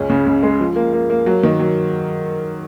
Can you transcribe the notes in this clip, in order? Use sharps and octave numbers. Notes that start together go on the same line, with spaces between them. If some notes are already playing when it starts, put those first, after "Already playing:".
Already playing: C#2 C#4
C#3
C#2
G#3
F3
A#3
A#3
A#3
F#3
D#3
F#3